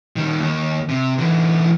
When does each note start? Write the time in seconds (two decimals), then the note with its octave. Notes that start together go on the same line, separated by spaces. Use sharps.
0.16 D#3 G3
0.39 D#2
0.89 C3
1.18 D3 E3